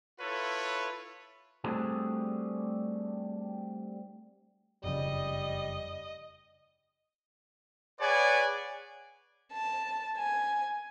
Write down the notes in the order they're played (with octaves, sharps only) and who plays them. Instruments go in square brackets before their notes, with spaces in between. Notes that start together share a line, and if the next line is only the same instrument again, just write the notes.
[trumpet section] E4 F4 A4 B4 C#5
[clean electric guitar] G3 A3 C4 D4 F#4 G#4
[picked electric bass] F#1 F2 C#3 [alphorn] G3 [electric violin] D#5
[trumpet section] G#4 B4 C#5 D5 F#5 G#5
[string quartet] A5
G#5